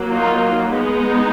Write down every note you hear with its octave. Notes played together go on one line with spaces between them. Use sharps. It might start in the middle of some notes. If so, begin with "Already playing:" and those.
Already playing: F#3 A#3
D#4 F4
G#3 B3 D#4